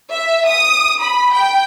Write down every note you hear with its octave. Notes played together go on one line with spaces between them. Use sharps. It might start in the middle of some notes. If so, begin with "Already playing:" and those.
E5
D#6
B5
G5